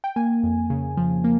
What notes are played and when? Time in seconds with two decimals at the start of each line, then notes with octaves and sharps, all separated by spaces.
0.04 G5
0.16 A#3 G#5
0.43 F2
0.70 C#3
0.97 F3
1.24 A#3